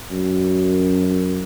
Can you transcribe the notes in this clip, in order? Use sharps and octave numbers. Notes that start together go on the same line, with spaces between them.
F#2